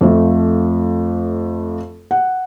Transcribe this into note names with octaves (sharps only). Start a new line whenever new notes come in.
F2 F3 A3
F#5